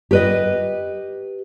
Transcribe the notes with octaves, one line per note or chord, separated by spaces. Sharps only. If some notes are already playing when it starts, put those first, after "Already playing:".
G4 B4 D#5